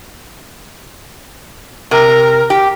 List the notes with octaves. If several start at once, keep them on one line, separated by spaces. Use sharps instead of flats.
C3 A#4
G4